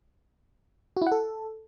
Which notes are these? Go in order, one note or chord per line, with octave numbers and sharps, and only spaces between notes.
F#4
E4
F#5
A4